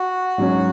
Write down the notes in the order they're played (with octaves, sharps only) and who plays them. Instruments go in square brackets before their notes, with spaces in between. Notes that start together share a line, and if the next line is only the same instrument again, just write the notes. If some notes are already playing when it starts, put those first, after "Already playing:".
Already playing: [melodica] F#4
[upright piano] G#2 F#3 C#4